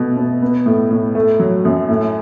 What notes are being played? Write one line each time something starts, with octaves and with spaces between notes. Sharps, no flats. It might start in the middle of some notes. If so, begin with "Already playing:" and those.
Already playing: B2 A3
B2
B3
A2
A2
A3
F#3
F#2
A2